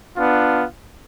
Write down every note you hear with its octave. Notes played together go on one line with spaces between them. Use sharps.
B3 D4 F4